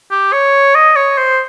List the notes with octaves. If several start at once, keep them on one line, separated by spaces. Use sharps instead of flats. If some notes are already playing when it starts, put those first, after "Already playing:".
G4
C#5
D#5
C#5
C5